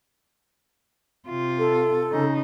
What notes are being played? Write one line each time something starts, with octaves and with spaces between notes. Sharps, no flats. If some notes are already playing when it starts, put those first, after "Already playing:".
C3 F4
A4
C#3 D#4